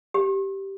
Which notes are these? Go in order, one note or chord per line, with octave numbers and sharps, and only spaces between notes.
G4